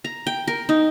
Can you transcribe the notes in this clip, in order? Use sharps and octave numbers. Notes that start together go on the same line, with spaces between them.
A#5
G5
A#4
D#4